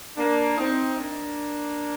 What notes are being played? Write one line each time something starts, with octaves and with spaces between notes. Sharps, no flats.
A#3 D4
C4 D#4
A#3 D4